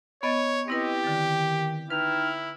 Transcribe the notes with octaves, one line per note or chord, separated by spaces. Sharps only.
B3 C#5 D#5 A6
C4 E4 G4 B4 D#5
D3 D#3 A6
D#4 E4 B4 G5 F6